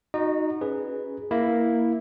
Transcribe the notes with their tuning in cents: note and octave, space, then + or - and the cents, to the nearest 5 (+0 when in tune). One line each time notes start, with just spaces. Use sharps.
D#4 +0 F#4 -15 D#5 -40
C#4 +0 G#4 +0 B4 +0
A#3 +0 E4 -5